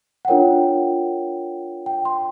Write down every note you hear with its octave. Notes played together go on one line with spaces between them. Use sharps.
F#5
D4 F4 A#4 C#5 G5
G5
C6